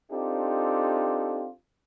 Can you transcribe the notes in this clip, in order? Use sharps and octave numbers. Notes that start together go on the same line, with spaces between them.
C4 D4 D#4 F4 G4 A4